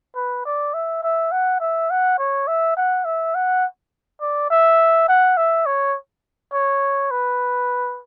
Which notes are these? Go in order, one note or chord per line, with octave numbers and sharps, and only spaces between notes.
B4
D5
E5
E5
F#5
E5
F#5
C#5
E5
F#5
E5
F#5
D5
E5
F#5
E5
C#5
C#5
B4